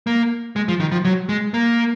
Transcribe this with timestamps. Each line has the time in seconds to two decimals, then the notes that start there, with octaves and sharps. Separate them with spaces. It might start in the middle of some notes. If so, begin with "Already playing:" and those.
0.07 A#3
0.56 G#3
0.68 F3
0.80 D#3
0.92 F3
1.05 F#3
1.29 G#3
1.54 A#3